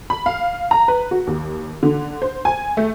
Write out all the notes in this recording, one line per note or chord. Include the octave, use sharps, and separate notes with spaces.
B5
F5
A#5
B4
F#4
D#2
D3
C5
G#5
A3